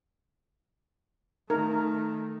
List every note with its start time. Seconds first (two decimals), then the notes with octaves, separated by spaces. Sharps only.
1.50 D#3 A3 D#4 A#4